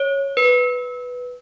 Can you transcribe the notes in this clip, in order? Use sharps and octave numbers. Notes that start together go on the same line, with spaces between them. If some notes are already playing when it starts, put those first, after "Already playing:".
Already playing: C#5
B4